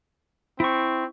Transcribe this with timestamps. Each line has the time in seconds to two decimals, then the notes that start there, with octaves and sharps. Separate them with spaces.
0.60 C4 E4 C#6